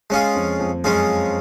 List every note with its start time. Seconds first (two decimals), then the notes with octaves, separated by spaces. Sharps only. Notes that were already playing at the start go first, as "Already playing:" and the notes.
0.10 G#3 C#4 F4 G#4
0.35 F2
0.59 F2
0.84 F#2 G#3 C#4 F4 G#4